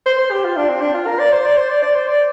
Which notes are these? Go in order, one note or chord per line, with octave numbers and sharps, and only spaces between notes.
C5
C5
G4
F4
D4
C4
D4
F4
A#4
D5
C5
D5
C5
D5
D5
C5
D5